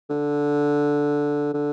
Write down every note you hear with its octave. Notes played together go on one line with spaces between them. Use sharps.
D3
D3